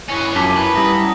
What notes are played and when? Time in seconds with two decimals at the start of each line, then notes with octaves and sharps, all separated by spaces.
0.09 G2 C#4 E4 C#6 F#6
0.36 F#2 F4 A5 D6 B6 G7
0.57 E4 B4 G#5
0.75 G3 C#4 E4 F#5 A#5 D#6 A#6